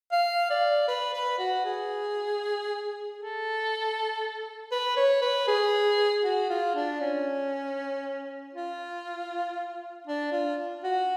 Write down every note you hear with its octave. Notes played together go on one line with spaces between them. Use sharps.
F5
D5
B4
B4
F#4
G#4
A4
B4
C#5
B4
G#4
F#4
F4
D4
C#4
F4
D4
F4
F#4